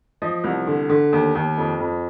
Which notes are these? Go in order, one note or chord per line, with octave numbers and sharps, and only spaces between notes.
F3 D#5
C2
D3
D3
D#2
D#2
F2
F2